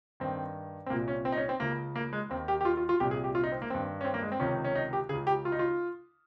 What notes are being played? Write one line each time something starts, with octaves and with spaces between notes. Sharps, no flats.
G2 D#3 C4
C4
C2 A#2 A#3
C#4
C4
D#4
C#4
C4
C#2 C#3 A#3
A#3
G#3
D#2 D#3 C4
G4
G4
F4
F4
F4
C2 A#2 G4
G#4
G4
F4
D#4
C4
A#3
G2 D#3 C4
C#4
C4
A#3
G#3
C4
C#2 C3 D#3 C#4
C#4
D#4
G4
C#2 C#3 G#4
G4
F4
D#4
F4